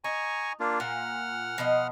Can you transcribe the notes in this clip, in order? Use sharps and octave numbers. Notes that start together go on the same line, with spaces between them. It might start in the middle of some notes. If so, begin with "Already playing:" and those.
D#4 G#5 A#5 C#6
A#3 D4 F4
A#2 F#5 F6
B2 F3 D#5